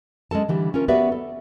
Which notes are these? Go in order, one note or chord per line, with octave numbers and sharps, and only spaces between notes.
G#3 C#4 A4 A5
D3 E3 G3
C#4 F4 A#4
B3 F#4 G4 B4 D5 E5
A4